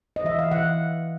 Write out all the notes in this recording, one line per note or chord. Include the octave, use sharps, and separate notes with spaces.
D#5
E3 E5
F5
E3 F#5